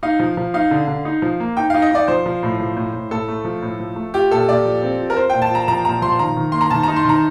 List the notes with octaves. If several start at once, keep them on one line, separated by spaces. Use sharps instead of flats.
D#4 F5
F3
F3
D#4 F5
D3
D3
D#4
F3
A#3
D#4 G5
D#4 F5
D#5
D#4 D5
F3 C5
F3
A2
F3
A2
A2
A2 A4
A3
F3
A2
F3
A3
F4 G4
A#2 A4
A#2 D5
F3
C4
F4
A#4
F4 C5
A#2 G5
A5
F4 A#5
F3 A#5
A#2 A#5
F3 C6
D#3 A#5
D#3
A#3 C6
A#5
D#3 A5
D#4 A#5
C6
D#3 A#5